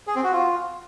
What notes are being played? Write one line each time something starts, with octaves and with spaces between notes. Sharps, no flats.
G#4
C4
F#4
F4